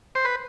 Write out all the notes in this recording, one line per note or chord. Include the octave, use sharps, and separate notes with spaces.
C5
B4